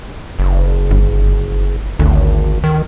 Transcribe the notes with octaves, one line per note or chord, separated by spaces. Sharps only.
F#1
G1
G#1 D2
D#3